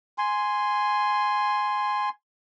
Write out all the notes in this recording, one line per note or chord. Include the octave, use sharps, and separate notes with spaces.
G#5 C6